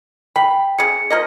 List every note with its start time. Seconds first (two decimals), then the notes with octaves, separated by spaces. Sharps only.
0.36 G5 B5
0.78 C#3 G#4 C#7
1.10 F3 A#3 D#5